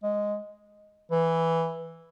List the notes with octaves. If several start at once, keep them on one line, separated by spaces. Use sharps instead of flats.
G#3
E3